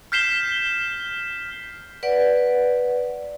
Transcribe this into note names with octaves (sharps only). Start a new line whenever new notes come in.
F6 G6 B6 C7 E7 G7
B4 D5 F#5